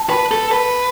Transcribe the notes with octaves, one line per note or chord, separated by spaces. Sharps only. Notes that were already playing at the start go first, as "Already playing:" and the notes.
Already playing: A5
B4
A4
B4